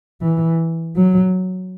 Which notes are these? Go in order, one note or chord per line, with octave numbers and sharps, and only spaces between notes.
E3
F#3